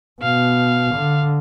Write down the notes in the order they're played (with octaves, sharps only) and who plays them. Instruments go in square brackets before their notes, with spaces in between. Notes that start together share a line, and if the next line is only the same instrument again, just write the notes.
[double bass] B2 [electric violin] F5
[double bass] D3